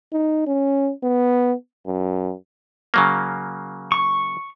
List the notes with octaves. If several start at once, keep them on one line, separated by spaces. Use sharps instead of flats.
D#4
C#4
B3
F#2
C#3 F#3 A#3
C#6